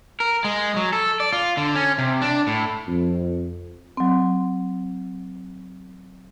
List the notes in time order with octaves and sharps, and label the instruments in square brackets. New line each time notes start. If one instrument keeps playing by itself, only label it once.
[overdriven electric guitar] A#4
G#3
F#3
A4
D5
F4
D3
C#4
C3
D4
A2
[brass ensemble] F2
[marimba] F#3 C4